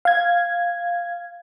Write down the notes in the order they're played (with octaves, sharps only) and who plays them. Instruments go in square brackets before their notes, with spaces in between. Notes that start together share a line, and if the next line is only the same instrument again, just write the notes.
[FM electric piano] F5 G#6